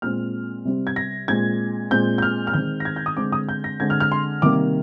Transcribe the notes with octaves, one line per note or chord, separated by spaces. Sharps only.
A#2 G#3 C4 F6
C3 G3 C4
G#6
A#6
A#2 G#3 C4 G#6
A#2 G#3 C4 G6
G6
F6
F6
D#3 G#3 C4 G6
A#6
G#6
G6
D#6
D3 G#3 C4 D6
D#6
G6
A#6
D3 G#3 C4 G#6
F6
F6
C6
C3 D#3 G3 A#3 D6